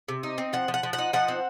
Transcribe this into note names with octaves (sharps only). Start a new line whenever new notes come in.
C3
D#4
C4
F3 F#5
F3
F#5
F3
F#5
D#4
F3 F#5
C4